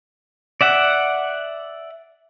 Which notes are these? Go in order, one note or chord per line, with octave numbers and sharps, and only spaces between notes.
D5 E5 F#5